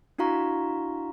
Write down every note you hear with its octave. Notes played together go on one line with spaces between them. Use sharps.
D4 E4 F#4 F5 A#5 C#6